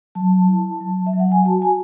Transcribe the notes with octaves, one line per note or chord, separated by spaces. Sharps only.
F#3 A5
E4
F#3
E5
F#3
F#5
G#5
F#4 A5
G#5